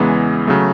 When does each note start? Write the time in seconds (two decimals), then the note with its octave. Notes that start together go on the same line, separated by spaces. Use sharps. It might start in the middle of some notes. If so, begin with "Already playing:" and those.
Already playing: E2 C#3 E3 G#3 B3
0.47 C#3 F#3 A3